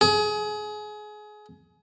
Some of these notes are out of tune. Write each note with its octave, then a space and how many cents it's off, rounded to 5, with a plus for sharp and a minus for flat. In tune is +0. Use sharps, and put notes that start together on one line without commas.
G#4 +25